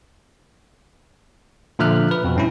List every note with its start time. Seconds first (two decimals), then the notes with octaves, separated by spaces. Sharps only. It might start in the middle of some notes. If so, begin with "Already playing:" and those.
1.79 A#2 D3 F3 E5 F6 F#6
2.11 B4
2.24 F2 B2
2.36 G2 C#4 E4